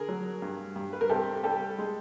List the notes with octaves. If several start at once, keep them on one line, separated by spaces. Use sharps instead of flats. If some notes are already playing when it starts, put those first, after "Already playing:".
Already playing: D3 G#4 A#4
F#3
G2
G2
B4
A#4
C3 G4 A4
G3 G4 A4
G#3